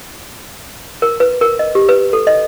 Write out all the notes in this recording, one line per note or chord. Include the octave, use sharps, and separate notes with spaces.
A#4
B4
A#4
D#5
G4
B4
A4
D#5